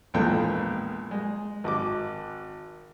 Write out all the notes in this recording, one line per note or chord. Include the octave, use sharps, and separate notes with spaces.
A#1 E2 G#3 A#3 A4 G5
G#3
G#1 D#5 D6